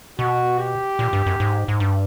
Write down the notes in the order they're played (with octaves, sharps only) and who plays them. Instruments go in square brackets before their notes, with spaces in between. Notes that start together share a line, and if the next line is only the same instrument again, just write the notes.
[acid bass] B2 [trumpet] F#4
[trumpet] G4
[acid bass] A#2
G2
F#2
G#2
G#2
G2